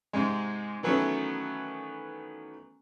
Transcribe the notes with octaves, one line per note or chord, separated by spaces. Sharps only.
G#2 C3 G#3
D#3 E3 F#3 A3 B3 C#4